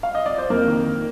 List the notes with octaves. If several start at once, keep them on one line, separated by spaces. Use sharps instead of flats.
F5
D#5
D5
C5
F2 A#3 A#4
D#3
D#3